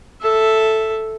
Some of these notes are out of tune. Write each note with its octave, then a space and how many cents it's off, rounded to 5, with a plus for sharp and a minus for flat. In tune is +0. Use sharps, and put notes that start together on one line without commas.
A4 +0 E5 +0